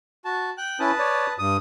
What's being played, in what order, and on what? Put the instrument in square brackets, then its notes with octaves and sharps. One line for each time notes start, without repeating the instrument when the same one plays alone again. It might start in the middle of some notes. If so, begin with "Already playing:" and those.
[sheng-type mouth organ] F#4 A5
G5 F#6
[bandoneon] C#4 E4 [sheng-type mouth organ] B4 A5 D#6
[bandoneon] C#5 D5
G2 D#6